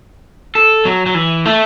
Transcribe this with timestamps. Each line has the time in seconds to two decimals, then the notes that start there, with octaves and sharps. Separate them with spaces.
0.55 A4
0.85 F#3
1.06 F#3
1.15 E3
1.45 A3